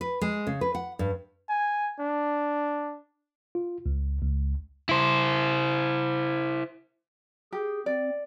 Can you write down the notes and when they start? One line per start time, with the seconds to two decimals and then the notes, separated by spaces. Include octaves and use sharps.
0.01 B4
0.21 G#3
0.47 C#3
0.61 B4
0.75 F#5
0.99 G2
1.49 G#5
2.00 D4
3.55 F4
3.86 C#2
4.22 C#2
4.89 E4 C5
7.52 G4 G#4
7.86 C4 D5